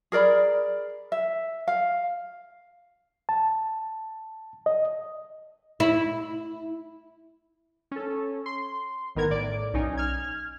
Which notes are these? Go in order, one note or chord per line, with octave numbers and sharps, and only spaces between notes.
G#4 A#4 D5 B5
E5
F5
A5
D#5
E4
C#4 A4
C6
A1 D#3 B3 A#4 G#6
A2 D5 D7
B1 C#4 D#4 G#5
F6 G#6